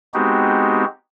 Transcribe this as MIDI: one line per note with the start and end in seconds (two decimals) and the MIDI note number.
0.14 0.85 56
0.14 0.85 59
0.14 0.85 60
0.14 0.85 63
0.14 0.85 66
0.14 0.85 67